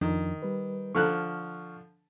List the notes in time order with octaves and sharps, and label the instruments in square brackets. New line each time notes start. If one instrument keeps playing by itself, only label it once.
[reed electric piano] F2 F3 D4 [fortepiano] D#3
[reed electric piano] G3 B4
[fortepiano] D3 F3 F#6 [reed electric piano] C#6 F6